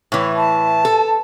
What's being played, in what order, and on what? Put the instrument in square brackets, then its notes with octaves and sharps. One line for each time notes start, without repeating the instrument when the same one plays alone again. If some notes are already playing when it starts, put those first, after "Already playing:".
[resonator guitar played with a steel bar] A2 E3
[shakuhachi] A5
[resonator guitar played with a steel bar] A4